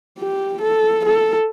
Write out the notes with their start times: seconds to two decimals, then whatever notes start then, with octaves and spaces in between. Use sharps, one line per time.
0.20 G4
0.62 A4
1.05 A4